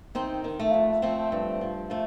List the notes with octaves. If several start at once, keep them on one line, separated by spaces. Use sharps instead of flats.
D#3 C4 D#4
D#3
A3
F2
F3 A3 C4
G2
F3
F3 A3